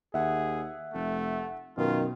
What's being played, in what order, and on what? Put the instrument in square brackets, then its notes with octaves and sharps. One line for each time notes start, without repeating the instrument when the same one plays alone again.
[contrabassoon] D#2 [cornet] G#4 [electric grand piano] E5 F#5
[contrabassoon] F1 [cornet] A3
[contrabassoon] F#2 [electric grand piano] B2 [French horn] D#3 [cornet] F4